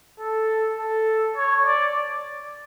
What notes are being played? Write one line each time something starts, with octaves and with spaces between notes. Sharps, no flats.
A4
A4
C#5
D5